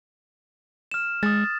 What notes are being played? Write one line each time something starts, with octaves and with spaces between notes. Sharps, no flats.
F6 E7
G#3 D#6 A6